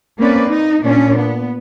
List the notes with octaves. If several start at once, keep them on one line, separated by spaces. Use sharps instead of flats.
A#3 C4 C#4 B4 D5
D#4
A#2 C#4 D4
B3